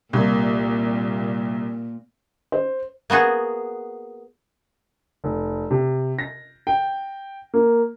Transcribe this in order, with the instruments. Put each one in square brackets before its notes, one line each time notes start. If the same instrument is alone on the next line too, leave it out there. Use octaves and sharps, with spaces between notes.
[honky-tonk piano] C2 [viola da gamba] A#2 [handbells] A#3
[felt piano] C5
[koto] A#3 B3 F#4 G#4
[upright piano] F1
C3
A#6
G5
A#3